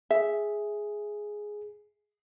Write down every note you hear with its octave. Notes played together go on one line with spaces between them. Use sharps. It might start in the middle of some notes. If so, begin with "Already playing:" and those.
G#4 E5